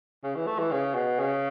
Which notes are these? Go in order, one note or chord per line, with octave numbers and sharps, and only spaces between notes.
C#3
E3
A3
E3
C#3
B2
C#3